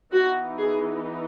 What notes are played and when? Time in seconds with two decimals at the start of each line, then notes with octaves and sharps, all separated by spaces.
0.13 E3 B3 D#4 F#4
0.58 G#4